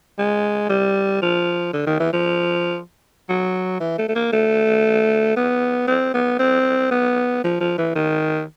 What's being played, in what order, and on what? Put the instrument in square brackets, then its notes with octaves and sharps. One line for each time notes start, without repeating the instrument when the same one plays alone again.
[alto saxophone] G#3
G3
F3
D3
D#3
E3
F3
F#3
E3
A3
A3
A#3
A3
B3
C4
B3
C4
B3
F3
F3
E3
D#3